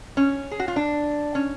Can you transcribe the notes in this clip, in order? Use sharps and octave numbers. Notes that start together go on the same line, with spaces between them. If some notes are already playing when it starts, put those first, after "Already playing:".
C#4
G#4
F#4
F4
D4
C#4